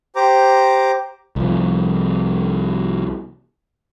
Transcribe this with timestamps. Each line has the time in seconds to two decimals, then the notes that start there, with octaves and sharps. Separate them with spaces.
0.16 G4 C5 A#5 D6
1.36 C2 F3